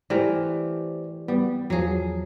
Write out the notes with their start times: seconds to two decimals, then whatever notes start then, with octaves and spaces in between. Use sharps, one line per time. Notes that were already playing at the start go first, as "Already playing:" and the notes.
0.10 E3 A3 G4 A#4 C5 D5
1.28 G3 B3
1.70 E2 F3 F#3 G#4